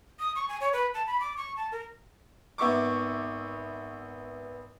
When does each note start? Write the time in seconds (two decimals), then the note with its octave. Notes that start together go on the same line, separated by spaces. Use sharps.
0.20 D#6
0.36 C#6
0.48 G#5
0.61 C#5
0.73 B4
0.94 A5
1.07 B5
1.20 D6
1.37 C#6
1.57 A5
1.72 A#4
2.58 G#1 B3 E5 C#6 D6